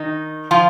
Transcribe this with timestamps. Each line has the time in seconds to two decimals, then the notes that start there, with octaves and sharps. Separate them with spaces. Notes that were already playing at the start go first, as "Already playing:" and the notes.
Already playing: D#3 D#4
0.51 F3 F4